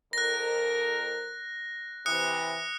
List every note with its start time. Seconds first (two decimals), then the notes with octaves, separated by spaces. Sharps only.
0.13 F2 A#4 F#6 A#6
2.06 C3 E3 D#6 F#6 C#7